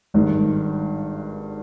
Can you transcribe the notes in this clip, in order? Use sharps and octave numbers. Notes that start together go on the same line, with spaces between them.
G#1 G2 D#3